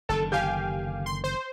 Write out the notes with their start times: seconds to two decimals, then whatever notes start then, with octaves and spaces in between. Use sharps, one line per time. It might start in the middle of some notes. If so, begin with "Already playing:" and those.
0.09 F#1 D3 D#3 A4 A5
0.32 G4 F5 G5 G#5 G6
1.06 C6
1.24 C5